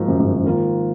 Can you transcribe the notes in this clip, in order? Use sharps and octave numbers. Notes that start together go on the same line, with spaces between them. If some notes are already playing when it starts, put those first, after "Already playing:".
Already playing: G#2 F3 A#3 D#4 F#4
F#2
G#2
G#2
D#3 A#3 F4